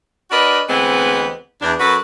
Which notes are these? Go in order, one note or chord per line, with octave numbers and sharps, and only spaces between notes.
D4 F#4 A#4 B4 D5 D#5
D2 E3 G#3 B3 C4
E2 D4
F#2 F#4 A4 B4